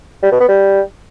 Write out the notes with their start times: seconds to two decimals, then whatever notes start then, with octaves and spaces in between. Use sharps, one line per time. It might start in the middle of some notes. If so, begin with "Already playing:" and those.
0.23 G3
0.32 B2
0.40 B3
0.49 G3